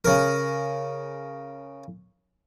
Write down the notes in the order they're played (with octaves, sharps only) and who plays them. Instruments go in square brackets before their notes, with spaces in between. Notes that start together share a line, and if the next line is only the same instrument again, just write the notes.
[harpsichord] C#3 A#4